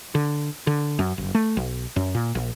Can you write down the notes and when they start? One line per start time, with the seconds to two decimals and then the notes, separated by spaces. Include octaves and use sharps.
0.15 D3
0.67 D3
0.99 F#2
1.18 F#1
1.35 A3
1.57 B1
1.96 F#2
2.15 A#2
2.35 A#1